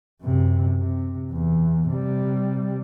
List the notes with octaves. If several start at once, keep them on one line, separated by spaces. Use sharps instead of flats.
F#2 C3
C3
E2
C3 G3